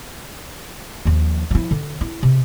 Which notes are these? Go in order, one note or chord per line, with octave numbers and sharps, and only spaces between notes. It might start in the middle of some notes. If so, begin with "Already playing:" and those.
D#2 F3
F3 E4
D3
E4
C3